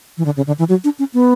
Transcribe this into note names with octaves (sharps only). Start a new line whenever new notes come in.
E3
D3
C#3
D3
E3
F#3
D4
C#4
B3